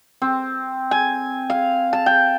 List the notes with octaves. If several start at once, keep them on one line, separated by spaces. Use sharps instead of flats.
C4
G#5
F5
A5
G5